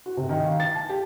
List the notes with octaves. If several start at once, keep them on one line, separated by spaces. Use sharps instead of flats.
F#4
C3
D#3
F5
A6
A5
G4